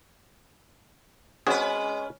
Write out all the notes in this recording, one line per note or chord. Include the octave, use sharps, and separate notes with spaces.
G#3 C4 C#4 F#4 G#4 B4